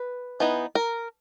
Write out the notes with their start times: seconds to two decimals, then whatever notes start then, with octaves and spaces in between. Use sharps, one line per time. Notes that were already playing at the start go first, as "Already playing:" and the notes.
Already playing: B4
0.40 E3 B3 D#4
0.75 A#4